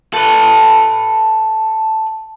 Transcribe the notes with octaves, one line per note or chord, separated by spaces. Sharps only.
A4 B4